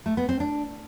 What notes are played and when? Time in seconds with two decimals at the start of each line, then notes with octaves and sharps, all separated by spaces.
0.06 A3
0.17 B3
0.29 C4
0.40 D4